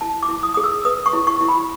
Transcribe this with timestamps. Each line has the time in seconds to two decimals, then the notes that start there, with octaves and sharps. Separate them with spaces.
0.01 E4 A5
0.23 D6
0.29 E4
0.43 D#6
0.54 G#4 D#6
0.64 E6
0.85 B4 D#6
1.06 C#6
1.13 E4
1.27 C#6
1.41 E4
1.49 B5